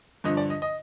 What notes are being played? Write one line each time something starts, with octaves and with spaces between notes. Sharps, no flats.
G2 D3 F3 D#5
D5
D#5
D#5